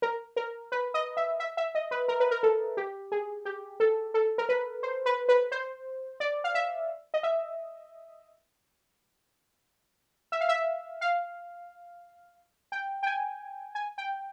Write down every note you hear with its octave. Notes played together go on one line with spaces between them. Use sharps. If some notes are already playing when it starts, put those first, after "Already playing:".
A#4
A#4
B4
D#5
E5
E5
E5
D#5
B4
A#4
B4
A#4
A4
G4
G#4
G4
A4
A4
A#4
B4
C5
B4
B4
C5
D5
F5
E5
D#5
E5
E5
F5
E5
F5
G5
G5
G#5
G#5
G5